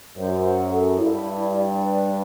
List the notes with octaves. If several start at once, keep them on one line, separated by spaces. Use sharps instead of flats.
F#2 C5
F#5
A4
G2 E4
D5
D5
B4
D4